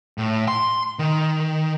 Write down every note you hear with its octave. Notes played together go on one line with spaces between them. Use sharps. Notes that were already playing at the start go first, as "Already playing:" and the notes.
A2
C6
D#3